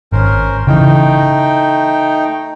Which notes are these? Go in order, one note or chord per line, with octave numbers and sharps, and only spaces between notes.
G#1 C#4 A#4 C5
C#3 E3 A3 D#4 G5